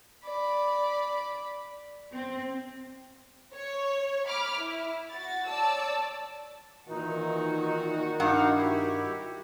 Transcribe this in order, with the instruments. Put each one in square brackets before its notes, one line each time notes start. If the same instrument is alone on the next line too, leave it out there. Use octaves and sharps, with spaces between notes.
[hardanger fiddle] D5 B5
[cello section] C4
[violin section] C#5
B5 D6 F6
E4
F#4 A6
C#5 D5 A5 E6
[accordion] A#2 E3 D#4 [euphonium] D#3 [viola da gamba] F#4
[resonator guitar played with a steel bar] G2 F#5 [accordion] D#4 F5
[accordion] E4 G4